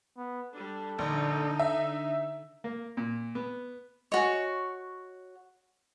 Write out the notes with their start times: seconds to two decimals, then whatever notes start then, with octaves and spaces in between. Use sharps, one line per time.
0.17 B3
0.53 G3 D4 A4
0.99 A#1 D3 D#4
1.59 E5
2.64 A#3
2.97 A#2
3.35 B3
4.12 F#4 C#5 D#5 F#5 G#5